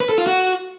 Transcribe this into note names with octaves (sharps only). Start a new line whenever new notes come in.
B4
A4
F4
F#4